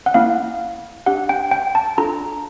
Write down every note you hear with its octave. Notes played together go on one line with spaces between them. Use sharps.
F#5
A#3 C#4 E4 F5
D4 G4 F#5
G5
G5
A5
D4 F4 A4 A#5